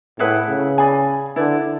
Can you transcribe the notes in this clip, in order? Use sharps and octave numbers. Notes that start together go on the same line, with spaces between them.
A2 E4 G#4 B4 F#5
C#3
G#4 D5 G#5 B5
D3 E4 B4 D5